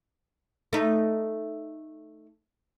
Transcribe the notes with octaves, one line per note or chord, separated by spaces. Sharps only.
A3 D#4